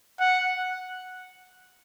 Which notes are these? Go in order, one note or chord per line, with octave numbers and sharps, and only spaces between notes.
F#5